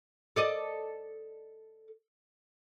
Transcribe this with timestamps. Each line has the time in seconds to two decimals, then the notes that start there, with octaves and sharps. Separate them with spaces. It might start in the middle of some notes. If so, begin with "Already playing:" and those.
0.36 A4 D5 D#5